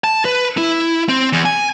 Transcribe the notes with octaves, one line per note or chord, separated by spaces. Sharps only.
A5
B4
E4
C4
E2
G#5